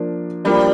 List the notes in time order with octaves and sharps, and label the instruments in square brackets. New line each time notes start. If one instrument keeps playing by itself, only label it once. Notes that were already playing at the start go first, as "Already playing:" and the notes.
Already playing: [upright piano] F3 A#3 D4
[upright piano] F3 A#3 D4 [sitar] G3